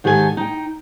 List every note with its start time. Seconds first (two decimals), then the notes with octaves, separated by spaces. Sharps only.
0.04 G#2 D#3 G4 A4 A#4 G#5
0.37 D#4 G5